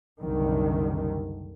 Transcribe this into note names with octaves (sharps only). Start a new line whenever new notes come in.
F#1 C2 D3 D#3